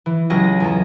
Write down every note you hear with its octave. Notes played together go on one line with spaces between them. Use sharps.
E3
C#2 F#3 F4 G4 G#4 A#6
E2 G#3 A4 A#5